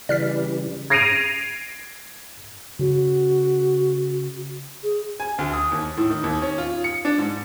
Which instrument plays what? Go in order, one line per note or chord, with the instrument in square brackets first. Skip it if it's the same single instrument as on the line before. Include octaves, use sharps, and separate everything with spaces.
[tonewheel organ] C#3 E3 G3 [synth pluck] D5 F6 B6
[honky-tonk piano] G#6 A#6 C7 D7 D#7 F7
[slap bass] C#3 [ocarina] F#4
[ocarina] G#4
[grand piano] G#5
D2
D#6
D#2
A2
D#3
D#2
C#4
F4
C#7
D4
G#2